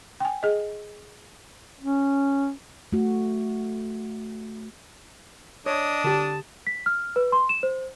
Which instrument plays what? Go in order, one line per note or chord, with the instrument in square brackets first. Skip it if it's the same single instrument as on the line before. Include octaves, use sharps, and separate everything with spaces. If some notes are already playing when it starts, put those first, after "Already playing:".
[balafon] G5 G#5
G#4 D#5
[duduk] C#4
[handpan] A3 F#4
[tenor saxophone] D4 [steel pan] C#5 [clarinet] D#5 [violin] D#6
[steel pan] D3 G4 [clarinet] A5
[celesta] B6
F6
B4
C6
E7
C5